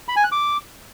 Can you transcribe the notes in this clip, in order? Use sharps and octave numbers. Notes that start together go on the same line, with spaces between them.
B5
G#5
F#6
D6